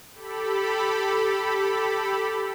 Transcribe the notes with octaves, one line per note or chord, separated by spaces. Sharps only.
G4 A4 B5